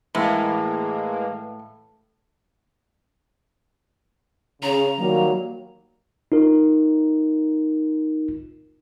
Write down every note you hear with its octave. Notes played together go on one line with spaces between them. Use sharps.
A2 E3 G#3 A#3
C#3 A#5
D#3 F#3 G3 A#3
D#4 F4 A#4